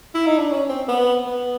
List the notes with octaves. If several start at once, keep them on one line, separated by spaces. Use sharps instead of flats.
E4
D#4
D4
C#4
C4
B3
B3